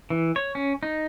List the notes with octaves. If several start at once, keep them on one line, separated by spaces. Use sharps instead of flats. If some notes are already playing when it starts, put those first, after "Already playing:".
E3
C#5
C#4
D#4